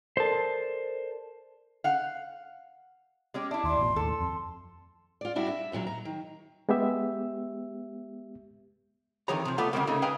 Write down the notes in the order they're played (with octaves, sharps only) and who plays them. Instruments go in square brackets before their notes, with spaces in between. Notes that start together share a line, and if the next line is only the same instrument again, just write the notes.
[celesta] A4 A#4 D5 [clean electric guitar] C5 A5
[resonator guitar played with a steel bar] F5 F#5
G#3 C#4 G4
[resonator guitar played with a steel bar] D4 E4 [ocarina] E5
[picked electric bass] D#2 [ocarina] C6
[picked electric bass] A1 B2
[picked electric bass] D#2 A2 [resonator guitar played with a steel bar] A4
[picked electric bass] F2 [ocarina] C6
[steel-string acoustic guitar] F4 D5
G3 D4 E4 F#4
E5
D#2 A#2 D3 F#3
A#5
D#3
[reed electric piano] G#3 B3 G4 E5
[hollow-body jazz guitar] F2 D#3 E3 G#4 C#5 A#5
C3 F3
A3 B3 F4 B4 D5
D2 C#3 E3 G3 G#3 A#3
C#3 A3 A#3 D#4
G#4 B4 F5 G5 G#5 A#5